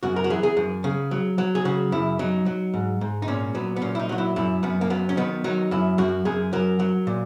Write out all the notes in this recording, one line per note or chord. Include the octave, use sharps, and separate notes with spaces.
F#2 F#4
A#4
F#4
E3 G#4
G#4
F#2
C#3
F#3
F#3
G#4
C#3 F#4
F#2 E4
F#3 D#4
F#3
G#2
G#2
D#4
A#2 C#4
F#3 B3
B3
A#2 C#4
E4
D#4
F#3 F#4
E4
F#2 E4
F#2 B3
A#3
F#3 B3
C#4
D#3 B3
F#3 D#4
F#2 E4
F#2 F#4
F#2 G#4
F#3 A#4
F#3
A#2